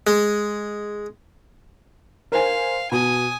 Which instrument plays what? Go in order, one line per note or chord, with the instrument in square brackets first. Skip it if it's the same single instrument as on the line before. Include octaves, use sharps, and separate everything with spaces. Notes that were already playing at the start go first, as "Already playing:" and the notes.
[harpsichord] G#3
[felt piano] A#4 C5 G#5 [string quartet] F5
[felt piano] B2 [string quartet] G#5 D#6